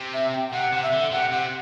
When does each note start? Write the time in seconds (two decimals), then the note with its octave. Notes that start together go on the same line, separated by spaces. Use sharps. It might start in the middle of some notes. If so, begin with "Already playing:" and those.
Already playing: C3
0.13 E5
0.32 G5
0.49 G5
0.53 C3 F#5
0.72 C3 F#5
0.83 E5
0.93 D3
1.11 C3 F#5
1.31 C3 F#5